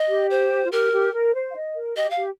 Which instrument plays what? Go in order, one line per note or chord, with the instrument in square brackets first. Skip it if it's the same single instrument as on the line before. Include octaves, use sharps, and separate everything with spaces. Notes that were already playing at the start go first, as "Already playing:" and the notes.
Already playing: [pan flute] D#5
[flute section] G4
[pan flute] C5
[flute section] F4
[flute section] G4 [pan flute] A#4
[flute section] G4
A#4
C5
F5
D#5
A#4
[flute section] G4 [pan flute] D#5
[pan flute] F5
[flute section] G4